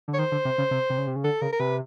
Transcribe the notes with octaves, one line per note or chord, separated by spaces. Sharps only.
D3
C#5
D#3 C5
D3
C3
C#3
C3
C3
C#3
C3
C#3
D3 A4
C#3 A#4
A#4
C3 B4